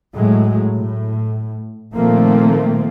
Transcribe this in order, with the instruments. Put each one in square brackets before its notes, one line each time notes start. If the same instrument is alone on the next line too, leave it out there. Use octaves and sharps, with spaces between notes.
[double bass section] A2 F#3 G#3
A2
A#2 D#3 F3 A3 A#3 C4